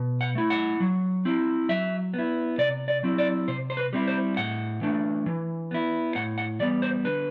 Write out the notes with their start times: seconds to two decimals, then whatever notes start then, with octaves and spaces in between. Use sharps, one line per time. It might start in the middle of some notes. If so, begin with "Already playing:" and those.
Already playing: B2
0.21 F#5
0.35 A3 E4
0.50 F#5
0.80 F#3
1.25 C4 E4
1.69 F#3 E5
2.14 B3
2.19 E4
2.58 C3 D5
2.88 D5
3.03 F#3 C4 E4
3.18 D5
3.48 C3 C5
3.70 C5
3.77 B4
3.93 G3 C4 E4
4.07 C5
4.37 A2 F#5
4.81 E3 A3 D4
5.26 E3
5.71 B3 E4
6.15 A2 F#5
6.38 F#5
6.60 E3 G3 B3 D5
6.82 C5
7.05 D3 B4